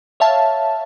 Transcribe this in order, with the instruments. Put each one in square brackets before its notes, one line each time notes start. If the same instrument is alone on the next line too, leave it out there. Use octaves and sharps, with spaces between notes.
[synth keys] C#5 E5 F5 A5